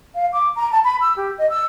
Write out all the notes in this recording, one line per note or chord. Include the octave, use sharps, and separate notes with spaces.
F5
D6
A#5
A5
B5
E6
G4
D#5
E6